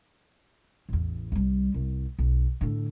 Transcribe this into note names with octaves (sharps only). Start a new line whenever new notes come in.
A1 E2
C2 G3
C2
B1
A2 D3